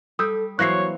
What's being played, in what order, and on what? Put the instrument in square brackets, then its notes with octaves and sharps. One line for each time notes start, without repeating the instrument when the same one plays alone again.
[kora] G3 [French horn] A4 [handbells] D#6 E6 G6
[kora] E3 A#3 C4 [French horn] F#3 [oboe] C#5 [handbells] F#6 A#6 C7